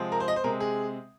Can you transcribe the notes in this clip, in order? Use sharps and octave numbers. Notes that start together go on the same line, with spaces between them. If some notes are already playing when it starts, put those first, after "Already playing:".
Already playing: C3 F3 G#3 C4
A#4
C5
D#5
C5
C3 G#3 C4 A#4
G#4